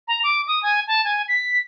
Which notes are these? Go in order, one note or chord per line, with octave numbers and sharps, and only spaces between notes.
A#5
D6
D#6
G#5
A5
G#5
B6